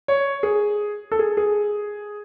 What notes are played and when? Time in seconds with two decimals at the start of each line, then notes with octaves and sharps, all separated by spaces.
0.08 C#5
0.43 G#4
1.12 A4
1.19 G#4
1.37 G#4